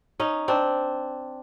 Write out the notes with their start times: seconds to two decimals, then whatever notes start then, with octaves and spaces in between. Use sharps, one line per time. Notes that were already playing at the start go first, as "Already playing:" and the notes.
0.20 C#4 D#4
0.48 C4 D4